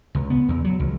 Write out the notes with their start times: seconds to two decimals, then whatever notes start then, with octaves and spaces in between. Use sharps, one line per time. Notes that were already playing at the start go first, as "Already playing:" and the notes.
0.15 C#2
0.30 B3
0.48 E2
0.64 F#3
0.80 C#2